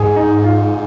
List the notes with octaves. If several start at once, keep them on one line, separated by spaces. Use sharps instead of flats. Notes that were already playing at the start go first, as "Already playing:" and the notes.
Already playing: G#2 G#4
D#4
F4